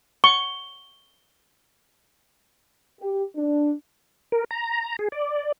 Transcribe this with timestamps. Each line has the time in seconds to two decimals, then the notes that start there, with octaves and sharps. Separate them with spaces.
0.24 C#6 G7
3.00 G4
3.36 D4
4.32 A#4
4.51 A#5
4.99 G#4
5.12 D5